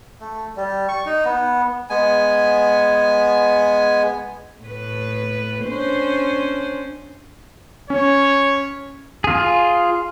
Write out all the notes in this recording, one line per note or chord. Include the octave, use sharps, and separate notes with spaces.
A3
G3
C#6
D#4
B3
G#3 B3 G#5
A2 B4
C#4 D4 C5
C#4 C#5
F4 G#4